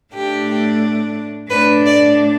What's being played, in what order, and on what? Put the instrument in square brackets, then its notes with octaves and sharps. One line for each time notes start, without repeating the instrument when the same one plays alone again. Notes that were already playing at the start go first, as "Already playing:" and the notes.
[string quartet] A2 A3 D4 G4
A2 A3 D4 B4
D5